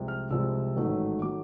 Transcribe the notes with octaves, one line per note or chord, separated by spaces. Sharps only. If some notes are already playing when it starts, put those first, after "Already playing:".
Already playing: C2 C3 F3 G#3
F6
C2 C3 F3 G#3 E6
A1 G#2 D#3 F#3 A3
D#3 F#3 A3 D6